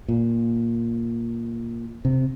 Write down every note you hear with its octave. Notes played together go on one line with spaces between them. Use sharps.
A#2
C3